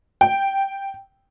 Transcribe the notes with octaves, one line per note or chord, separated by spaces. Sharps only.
G5